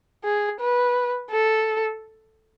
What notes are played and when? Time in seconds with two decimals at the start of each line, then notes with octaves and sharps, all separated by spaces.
0.24 G#4
0.60 B4
1.30 A4